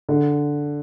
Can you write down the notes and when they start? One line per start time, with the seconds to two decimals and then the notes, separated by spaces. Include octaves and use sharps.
0.09 D3